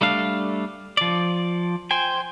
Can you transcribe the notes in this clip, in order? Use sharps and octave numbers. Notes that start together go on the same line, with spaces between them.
G3 A3 D4 F5
F3 D5
C5 G5 G#5